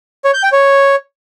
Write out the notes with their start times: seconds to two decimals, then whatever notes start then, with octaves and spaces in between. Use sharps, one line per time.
0.25 C#5
0.34 G6
0.43 G5
0.52 C#5